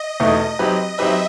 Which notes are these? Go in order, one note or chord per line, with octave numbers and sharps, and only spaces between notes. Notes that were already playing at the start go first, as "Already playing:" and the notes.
Already playing: D#5
E2 B2 A3 D#4 D#5
F#3 C4 D#4 G4 B4
F#3 C4 D#4 G4 B4 E5